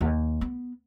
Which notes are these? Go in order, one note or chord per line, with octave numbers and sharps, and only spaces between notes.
D#2
B3